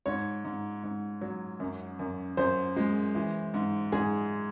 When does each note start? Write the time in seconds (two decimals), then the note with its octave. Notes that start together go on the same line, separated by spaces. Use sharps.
0.06 G#2 C#5
0.45 G#2
0.83 G#2
1.21 F#3
1.60 F#2
1.99 F#2
2.37 F#2 C5
2.76 G#3
3.15 E3
3.54 G#2
3.92 G#2 G#4